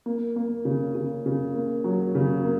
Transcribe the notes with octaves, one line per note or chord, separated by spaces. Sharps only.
A#3
A#3
C#3
C#3
C#3
A#3
F#3
C#3
A#3